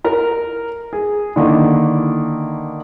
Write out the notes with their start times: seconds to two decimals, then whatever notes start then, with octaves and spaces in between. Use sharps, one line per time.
0.04 A#4 A#5
0.93 G#4
1.36 D3 D#3 A#3 E4